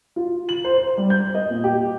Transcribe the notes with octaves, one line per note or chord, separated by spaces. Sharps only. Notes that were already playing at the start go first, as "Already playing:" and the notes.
F4
F#7
C5
C5
G3
G6
D#5
A#2
G4